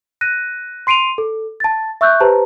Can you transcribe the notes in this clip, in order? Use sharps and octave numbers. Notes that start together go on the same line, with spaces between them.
F#6 A#6 D#7
C6 C7 D7 D#7 F7
A4
A5 A6
E5 C#6 E6 F#6 G6
G4 B4 C5 A5 A#5